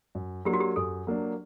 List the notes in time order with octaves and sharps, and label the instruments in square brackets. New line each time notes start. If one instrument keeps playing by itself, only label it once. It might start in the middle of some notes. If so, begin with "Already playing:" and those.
[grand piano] F#2
[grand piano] F#3 A#3 D4 [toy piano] G4
[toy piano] F#4
G4
[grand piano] F#2 [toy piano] A4
[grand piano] F#3 A#3 D4